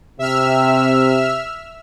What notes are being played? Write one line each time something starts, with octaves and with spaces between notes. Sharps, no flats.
C3 E5 E6 F6